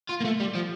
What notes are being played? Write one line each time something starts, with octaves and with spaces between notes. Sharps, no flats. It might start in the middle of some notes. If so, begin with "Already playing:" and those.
F4
A#3
A3
G3
F3